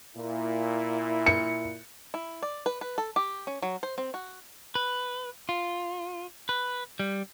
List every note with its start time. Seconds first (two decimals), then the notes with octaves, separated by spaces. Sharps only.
0.17 A#2 E4
1.26 C#7
2.14 E4
2.43 D5
2.66 B4
2.81 B4
2.98 A4
3.16 G4
3.47 C#4
3.62 F#3
3.83 C5
3.98 C4
4.14 F#4
4.75 B4
5.49 F4
6.49 B4
6.99 G3